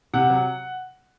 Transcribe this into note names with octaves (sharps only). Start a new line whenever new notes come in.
C3 F#5
F#3